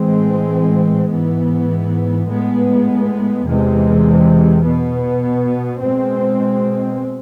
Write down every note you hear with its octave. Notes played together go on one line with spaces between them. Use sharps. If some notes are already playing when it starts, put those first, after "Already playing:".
Already playing: A2 E3 G#3 C4
G#2 E3 B3
A2 G#3 B3
E2 C3 E3 G#3
B2 B3
B2 G#3 C4